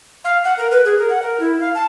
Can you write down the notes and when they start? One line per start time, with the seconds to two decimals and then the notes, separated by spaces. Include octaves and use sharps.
0.24 F5
0.44 F#5
0.58 A#4
0.71 B4
0.85 G#4
0.98 A#4
1.10 F#5
1.22 A#4
1.40 E4
1.60 F5
1.75 A5